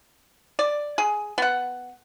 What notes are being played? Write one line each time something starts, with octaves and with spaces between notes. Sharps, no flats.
D5
G#4
B3 F#5